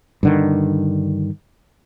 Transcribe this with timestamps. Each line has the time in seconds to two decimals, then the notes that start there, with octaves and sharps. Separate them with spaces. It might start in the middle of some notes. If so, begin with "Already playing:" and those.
0.23 G2 D3 D#3